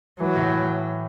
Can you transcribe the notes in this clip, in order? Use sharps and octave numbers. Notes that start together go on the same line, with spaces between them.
E3 F#3
A2